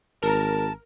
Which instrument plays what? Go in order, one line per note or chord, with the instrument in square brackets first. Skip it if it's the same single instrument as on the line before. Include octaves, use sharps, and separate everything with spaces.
[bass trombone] G#1 [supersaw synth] A#4 [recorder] A5